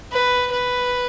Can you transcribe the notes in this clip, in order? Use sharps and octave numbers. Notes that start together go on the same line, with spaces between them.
B4
B4